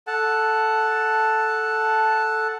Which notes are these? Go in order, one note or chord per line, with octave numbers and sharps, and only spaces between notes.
A4 F#5 A5